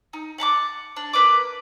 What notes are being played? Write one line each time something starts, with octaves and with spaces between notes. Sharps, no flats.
D#4
F#5 A5 A#5 D6
D4
A#3 B4 D5 D6